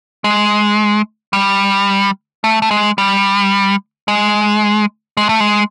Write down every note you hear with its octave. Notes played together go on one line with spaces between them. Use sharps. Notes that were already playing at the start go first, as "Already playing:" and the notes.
G#3
G3
A3
A3
G#3
G3
G#3
G#3
A3
G#3